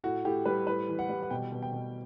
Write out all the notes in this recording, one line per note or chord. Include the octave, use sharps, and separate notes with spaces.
A2 F#4
A2 G4
G3 B4
A2 B4
E3
F#5
G3
F#5
B2 G5
B2
G5
B2